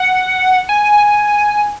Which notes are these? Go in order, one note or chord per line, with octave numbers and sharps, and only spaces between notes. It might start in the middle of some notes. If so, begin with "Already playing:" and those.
Already playing: F#5
G#5